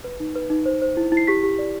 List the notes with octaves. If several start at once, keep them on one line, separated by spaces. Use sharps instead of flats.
B4
D#4
B4
D#4
C5
C5
E4
E4
C7
G4 B6
G4
D5